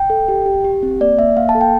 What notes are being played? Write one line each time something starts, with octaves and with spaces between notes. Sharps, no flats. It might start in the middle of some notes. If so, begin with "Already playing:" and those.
Already playing: G5
A4
G4
G4
G4
C4
A#3 D5
A#3 E5
A#3 F5
A5
A4
G5